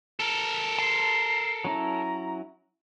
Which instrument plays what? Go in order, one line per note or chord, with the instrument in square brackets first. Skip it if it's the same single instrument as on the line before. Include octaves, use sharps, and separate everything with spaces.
[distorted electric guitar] A4 A#4
[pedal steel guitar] A5 C6 [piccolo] C7
[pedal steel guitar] F#3 C#4 E4 [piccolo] A#5